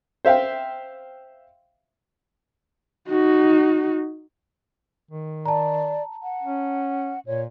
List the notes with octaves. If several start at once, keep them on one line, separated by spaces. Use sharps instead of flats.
C5 E5 F5 G5
D#4 F#4
D#3
D5 A5 A#5
F#5
C#4
A#2 C#5